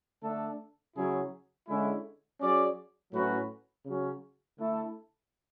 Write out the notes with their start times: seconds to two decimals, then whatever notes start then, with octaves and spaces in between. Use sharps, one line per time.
0.23 D3 A3 D4 A4
0.95 C#3 F#3 C#4 E4 G#4
1.68 D3 G#3 C#4 E4
2.40 F#3 C#4 G#4 D5
3.12 A2 F#3 C#4 F#4 B4
3.85 C#3 F#3 C#4
4.57 D3 A3 E4 A4